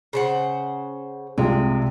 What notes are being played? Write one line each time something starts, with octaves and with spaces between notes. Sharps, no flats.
C#3 C5 F#5
C2 C3 G#3 F4